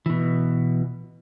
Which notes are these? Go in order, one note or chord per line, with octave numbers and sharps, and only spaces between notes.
B2 E3